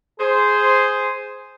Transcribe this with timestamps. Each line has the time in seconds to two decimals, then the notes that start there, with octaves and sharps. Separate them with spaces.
0.19 G#4 C5